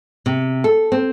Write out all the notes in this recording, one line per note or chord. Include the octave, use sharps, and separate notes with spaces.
C3
A4
C4